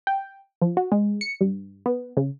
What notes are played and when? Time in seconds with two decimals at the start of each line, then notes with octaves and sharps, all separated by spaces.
0.07 G5
0.62 F3
0.77 F#4
0.92 G#3
1.21 C#7
1.41 G2
1.86 B3
2.17 C#3